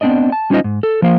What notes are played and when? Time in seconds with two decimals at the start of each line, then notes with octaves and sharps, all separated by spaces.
0.01 B3 C4 D4 D5 D#5
0.32 A5
0.50 G3 C#4 D#4 F4 C5 D#5
0.64 G#2
0.83 A4
1.02 F3 A#3 C5 F5